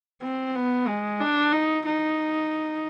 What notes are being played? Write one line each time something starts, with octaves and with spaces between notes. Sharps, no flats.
C4
B3
G#3
D4
D#4
D#4